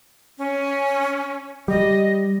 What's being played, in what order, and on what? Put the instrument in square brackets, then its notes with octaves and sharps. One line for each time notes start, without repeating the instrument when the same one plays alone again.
[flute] C#4
[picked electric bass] G3 [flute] D#5